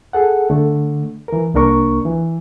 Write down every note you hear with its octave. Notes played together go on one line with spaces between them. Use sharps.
G#4 A4 F#5
D3 A3
E3 A#4
C2 A#3 D4 A#4 C#6
E3